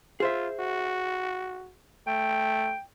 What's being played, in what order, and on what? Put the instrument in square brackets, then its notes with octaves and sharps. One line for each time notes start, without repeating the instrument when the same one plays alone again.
[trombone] F4 [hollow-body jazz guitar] G#4 C5 E5
[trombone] F#4
[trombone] A3 [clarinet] G5